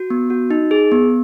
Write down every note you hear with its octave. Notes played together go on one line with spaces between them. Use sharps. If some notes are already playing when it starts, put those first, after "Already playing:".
Already playing: F#4
B3
F#4
D#4
G#4
B3